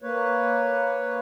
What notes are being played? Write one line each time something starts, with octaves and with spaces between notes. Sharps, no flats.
A#3 B4 C#5